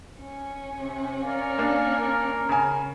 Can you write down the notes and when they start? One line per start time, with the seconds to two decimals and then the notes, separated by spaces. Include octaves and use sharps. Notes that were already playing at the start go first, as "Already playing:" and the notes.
0.22 C#4
0.77 C3
1.22 A#4 D5 F5
1.58 A#3 D4
2.00 A#4
2.49 C#3 G#5